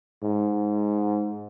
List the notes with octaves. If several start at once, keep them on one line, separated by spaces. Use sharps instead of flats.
G#2